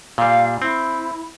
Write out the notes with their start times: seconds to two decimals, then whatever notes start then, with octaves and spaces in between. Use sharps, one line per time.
0.18 A#2 G3 F5
0.62 C4 E4